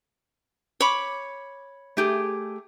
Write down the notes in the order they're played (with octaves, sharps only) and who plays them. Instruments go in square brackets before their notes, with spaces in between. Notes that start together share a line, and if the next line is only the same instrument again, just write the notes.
[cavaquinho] C#5 B5 D6
[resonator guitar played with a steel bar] A3 G4 G#4